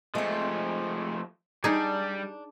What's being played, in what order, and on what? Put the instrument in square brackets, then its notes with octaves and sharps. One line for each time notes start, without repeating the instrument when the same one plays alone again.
[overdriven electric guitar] F3 A3 [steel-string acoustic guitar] G#3 C4
[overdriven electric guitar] G3 [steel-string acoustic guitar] D4 [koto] D#4 G#4